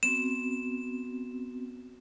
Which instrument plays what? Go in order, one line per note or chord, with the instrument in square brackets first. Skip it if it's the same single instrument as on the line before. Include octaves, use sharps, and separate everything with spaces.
[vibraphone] B3 C4 F#4 [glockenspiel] E7